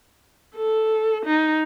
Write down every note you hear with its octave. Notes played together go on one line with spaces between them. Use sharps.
A4
D#4